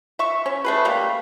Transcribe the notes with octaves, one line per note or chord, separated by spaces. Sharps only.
E5 C#6
C#4
A3 G#4 B4
G3 A#3